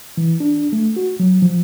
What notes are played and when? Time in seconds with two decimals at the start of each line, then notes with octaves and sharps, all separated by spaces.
0.17 E3
0.40 D4
0.73 A3
0.96 F#4
1.20 F#3
1.42 F3